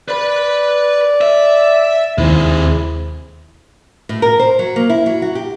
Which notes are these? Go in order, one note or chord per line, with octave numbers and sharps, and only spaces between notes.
B4 D5 B5
E5
D#2 C3 G#3 E4
A2
A#4
C5
F#3
A#3
E4
F#3
F#4
G4